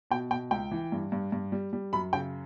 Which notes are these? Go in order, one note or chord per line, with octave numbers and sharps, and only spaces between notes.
B2 G5
B2 G5
C#2 G5
E3
G2
G2
G2
G3
G3
F#2 B5
C#3 G5